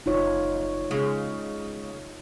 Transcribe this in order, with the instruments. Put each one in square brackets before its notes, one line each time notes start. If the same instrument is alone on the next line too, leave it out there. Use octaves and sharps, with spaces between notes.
[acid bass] F#1 [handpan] D#4 F4 C#5
[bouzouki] C#3 [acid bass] G#3